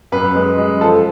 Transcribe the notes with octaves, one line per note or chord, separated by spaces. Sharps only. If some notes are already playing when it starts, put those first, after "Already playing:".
F#2 B4
G#3
G#3
F3 A4